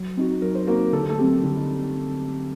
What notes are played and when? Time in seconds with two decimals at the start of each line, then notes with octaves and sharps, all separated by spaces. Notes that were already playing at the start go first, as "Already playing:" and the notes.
Already playing: F#3
0.17 C4 D#4 F#4
0.42 F#3 A#4
0.55 C5
0.67 A#3 C4 D#4 F#4 A#4
0.92 D3 A4
1.01 G4
1.09 A3 A4
1.18 F#3 C4 G4
1.43 D3 G3 G4
1.57 D#4